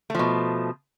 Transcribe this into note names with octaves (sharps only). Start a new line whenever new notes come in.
B2 F3 A3